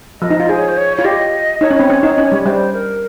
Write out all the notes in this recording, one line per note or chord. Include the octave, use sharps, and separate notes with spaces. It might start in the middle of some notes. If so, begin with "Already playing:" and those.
F3 D#5
D#4
F4
G#4 C5
C#5
C5
C#5
F4 C#5
G4 D#5
D#4 C#5
C#4
C4 C#5
C#4
D#4
C#4
G3
G3 C5
A#4